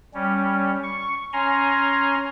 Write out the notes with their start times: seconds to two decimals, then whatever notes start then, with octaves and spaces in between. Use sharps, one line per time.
0.14 G3 C#4
0.83 C#6
1.33 C#4 G#5 A#5 C6